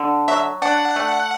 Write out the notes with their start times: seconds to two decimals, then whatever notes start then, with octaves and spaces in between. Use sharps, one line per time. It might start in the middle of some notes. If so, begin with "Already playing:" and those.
Already playing: D3
0.28 F#3 E5
0.62 D4 F#5
0.96 A3